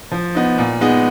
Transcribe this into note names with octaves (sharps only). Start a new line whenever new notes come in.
F3
B3 D#4
A#2
G#3 B3 D#4